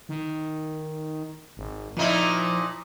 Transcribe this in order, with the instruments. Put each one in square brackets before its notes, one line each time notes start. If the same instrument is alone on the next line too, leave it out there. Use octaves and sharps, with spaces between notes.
[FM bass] D#3
G#1
[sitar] A#2 D#4 E4 [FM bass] F3